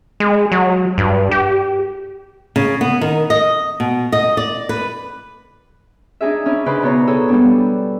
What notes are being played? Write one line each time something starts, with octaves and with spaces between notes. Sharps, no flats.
G#3
F#3
G2
G4
C#3
B3
D#3
D#5
B2
D#5
D5
B4
D4 D#4 G#4 E5
C#4 D4 E4
C#3 D#4 B4 C5 D5
B2 B3 C#5 A#5
G#4 A4 C#5 E6
G3 B3 D4